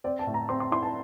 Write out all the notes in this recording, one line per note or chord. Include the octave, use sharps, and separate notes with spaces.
C4 D5
A5
A2
A#5
C4 C6
C6
E4 C6
A5